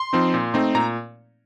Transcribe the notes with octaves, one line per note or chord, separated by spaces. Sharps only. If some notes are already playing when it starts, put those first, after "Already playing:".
Already playing: C6
F3 C4 D#4
A#2
A3 C4 D#4
A#2 A#5